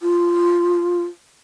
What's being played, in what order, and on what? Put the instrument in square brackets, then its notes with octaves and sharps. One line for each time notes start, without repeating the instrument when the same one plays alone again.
[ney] F4